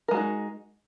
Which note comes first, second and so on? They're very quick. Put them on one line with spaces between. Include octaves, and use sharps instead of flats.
A#4 G#3 F#4 D#4